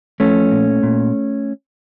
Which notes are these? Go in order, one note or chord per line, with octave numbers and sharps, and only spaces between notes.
F3 A3 C#4
A#2
A#2